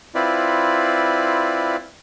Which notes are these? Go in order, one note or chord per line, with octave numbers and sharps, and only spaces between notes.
C4 E4 F4 B4 D5